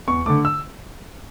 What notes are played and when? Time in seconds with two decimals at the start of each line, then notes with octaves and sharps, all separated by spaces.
0.08 E2 C#6
0.26 D3 A3 D6
0.45 E6